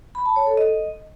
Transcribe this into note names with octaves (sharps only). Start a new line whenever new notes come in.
B5
A5
C#5
A4
D#5